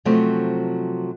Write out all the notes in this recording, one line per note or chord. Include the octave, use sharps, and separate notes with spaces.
C3 F3 F#3 A3 C4